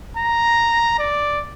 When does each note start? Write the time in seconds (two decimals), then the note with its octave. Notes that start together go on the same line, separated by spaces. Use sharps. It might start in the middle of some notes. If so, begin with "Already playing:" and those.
0.17 A#5
0.99 D5